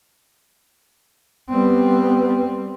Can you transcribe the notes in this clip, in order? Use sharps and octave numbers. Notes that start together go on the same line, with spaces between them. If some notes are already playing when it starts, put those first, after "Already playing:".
G3 B3 C4